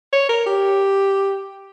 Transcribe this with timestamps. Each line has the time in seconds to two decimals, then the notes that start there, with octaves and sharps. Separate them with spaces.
0.13 C#5
0.29 A#4
0.46 G4